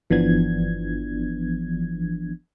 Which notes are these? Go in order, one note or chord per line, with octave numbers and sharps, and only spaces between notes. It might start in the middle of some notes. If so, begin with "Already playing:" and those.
G1 E3 F3 B3 D4 G#6